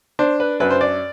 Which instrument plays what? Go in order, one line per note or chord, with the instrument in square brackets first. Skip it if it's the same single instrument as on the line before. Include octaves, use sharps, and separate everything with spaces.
[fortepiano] D4 C5
B4
F#2 B4
C5
D5